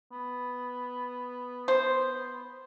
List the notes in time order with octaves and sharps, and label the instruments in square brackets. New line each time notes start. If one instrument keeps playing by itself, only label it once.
[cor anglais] B3
[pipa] C5